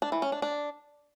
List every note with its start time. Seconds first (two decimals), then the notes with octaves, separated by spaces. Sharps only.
0.02 D4
0.12 E3
0.22 C#4
0.32 D4
0.42 D4